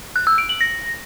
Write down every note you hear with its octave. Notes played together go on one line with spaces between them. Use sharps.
F#6
E6
D7
F#7
A#6